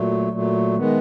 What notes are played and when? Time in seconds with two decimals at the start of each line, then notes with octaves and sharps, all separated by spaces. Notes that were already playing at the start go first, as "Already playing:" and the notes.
Already playing: A#2 F#3 A3
0.31 A#2 F#3 A3
0.77 D#3 G#3 B3